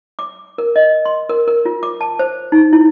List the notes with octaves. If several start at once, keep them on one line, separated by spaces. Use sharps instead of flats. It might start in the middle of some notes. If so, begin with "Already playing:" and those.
D6
A#4
D#5
C6
A#4
A#4
F4
D6
A5
C5
D#4
E4